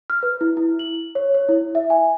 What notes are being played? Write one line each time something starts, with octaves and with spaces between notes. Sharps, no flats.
F6
B4
E4
E4
F#7
C#5
C#5
E4
E5
G#5